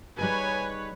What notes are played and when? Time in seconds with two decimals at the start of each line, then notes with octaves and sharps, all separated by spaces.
0.19 G3 D#4 G#4 B4 C#5 G#5